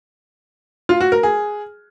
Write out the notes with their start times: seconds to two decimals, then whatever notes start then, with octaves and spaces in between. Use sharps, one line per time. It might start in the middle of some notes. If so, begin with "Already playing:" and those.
0.89 F4
1.01 F#4
1.12 A#4
1.23 G#4